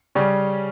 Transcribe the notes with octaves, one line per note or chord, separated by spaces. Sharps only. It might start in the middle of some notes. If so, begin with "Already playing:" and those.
C#3 G3 C#4